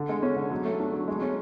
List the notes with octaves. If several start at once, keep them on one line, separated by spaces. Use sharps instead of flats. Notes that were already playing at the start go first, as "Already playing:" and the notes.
Already playing: D3
G#3
C#4
D3
F#3
A3
D4
F#3
G#3
C#4